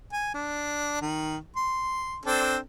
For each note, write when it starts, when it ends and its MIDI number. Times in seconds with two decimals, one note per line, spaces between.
0.13 0.32 80
0.34 1.01 62
1.02 1.37 51
1.56 2.17 84
2.25 2.57 60
2.25 2.57 62
2.25 2.57 69